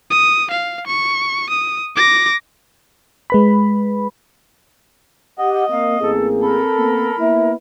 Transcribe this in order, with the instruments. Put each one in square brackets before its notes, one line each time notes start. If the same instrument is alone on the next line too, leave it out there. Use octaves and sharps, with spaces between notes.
[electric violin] D#6
F5
C#6
D#6
D6 A#6
[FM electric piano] G#3 B4 B5
[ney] G4 [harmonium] D#5 [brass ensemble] F#5
[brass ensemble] A#3 [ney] C4 [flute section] F5
[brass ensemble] A1 A#3 G#4 [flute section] A4
[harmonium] A4 [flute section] A#4 B5
[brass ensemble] A#3 B3
[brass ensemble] A#3 B3 E4 [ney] E5